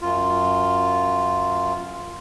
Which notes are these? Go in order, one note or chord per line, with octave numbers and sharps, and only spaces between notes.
F#2 F4